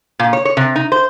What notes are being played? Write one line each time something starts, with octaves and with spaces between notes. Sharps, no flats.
A#2
C#5
C#5
C3
D#4
C5